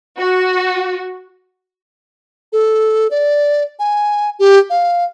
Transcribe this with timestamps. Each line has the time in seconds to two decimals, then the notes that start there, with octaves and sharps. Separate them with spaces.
0.18 F#4
2.53 A4
3.11 D5
3.79 G#5
4.39 G4
4.70 F5